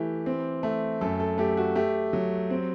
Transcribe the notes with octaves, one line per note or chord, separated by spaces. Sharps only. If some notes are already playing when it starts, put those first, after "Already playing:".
Already playing: E3 A3 G4
C4
A3
F#2 A4
A4
A3 G4
F#4
A3 G4
F#3
C4